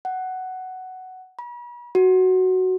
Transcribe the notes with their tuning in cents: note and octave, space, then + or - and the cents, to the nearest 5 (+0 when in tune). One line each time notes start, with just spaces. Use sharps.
F#5 +10
B5 -45
F#4 +5